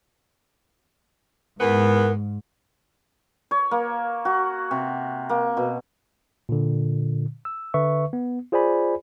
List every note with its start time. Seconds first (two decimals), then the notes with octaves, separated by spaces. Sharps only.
1.60 E2 G#2 B3 A#4
3.51 C#5
3.71 A#3
4.25 F#4
4.71 C3
5.29 A#3
5.57 B2
6.49 A#2 D3
7.45 E6
7.74 D3 B4 E5 C#6
8.13 B3
8.52 F4 G#4 C5 D5 G#5 B5